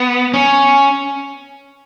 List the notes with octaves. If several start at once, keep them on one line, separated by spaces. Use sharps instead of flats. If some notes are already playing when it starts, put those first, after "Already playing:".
Already playing: B3
C#4